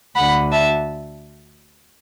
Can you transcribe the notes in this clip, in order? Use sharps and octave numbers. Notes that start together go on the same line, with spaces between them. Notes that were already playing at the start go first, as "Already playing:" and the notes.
D2 D3 F#5 B5
E5 A5